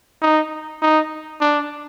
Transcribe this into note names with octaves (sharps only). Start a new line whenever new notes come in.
D#4
D#4
D4